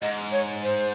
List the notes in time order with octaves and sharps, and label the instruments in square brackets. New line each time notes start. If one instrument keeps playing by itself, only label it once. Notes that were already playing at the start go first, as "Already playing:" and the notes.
[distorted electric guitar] G#2 [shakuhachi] D#5
[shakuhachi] C#5
C5